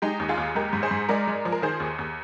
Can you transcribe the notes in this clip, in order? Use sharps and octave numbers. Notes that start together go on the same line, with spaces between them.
G#3 D#4 G4
D#2
F4 G#4
D#2
G#3 G4 A#4
G#2
G#4 C5
G#2
G#3 A#4 D5
G#3
F3
A#4
D#3 G#4 C5
D#2
D#2